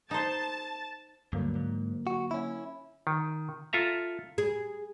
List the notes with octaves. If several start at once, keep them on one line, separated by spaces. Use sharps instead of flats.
D#4 C5 A5
D2 G2 D3 F#3 A#3
G#2
F#4
C#4 E4
D#3
F4 A4 E5 A#5
G#4